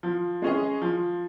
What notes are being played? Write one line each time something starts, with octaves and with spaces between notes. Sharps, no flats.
F3
G#3 C#4 G#4 D#5
F3